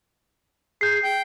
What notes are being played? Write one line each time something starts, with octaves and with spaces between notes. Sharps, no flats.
G#4 G6 C7
G5